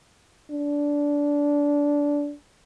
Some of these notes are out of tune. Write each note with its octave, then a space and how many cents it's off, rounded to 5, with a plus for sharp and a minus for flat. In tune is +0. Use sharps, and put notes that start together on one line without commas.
D4 -15